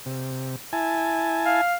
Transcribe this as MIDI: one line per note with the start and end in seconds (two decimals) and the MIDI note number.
0.06 0.56 48
0.73 1.61 64
0.73 1.61 80
0.73 1.61 81
1.46 1.76 77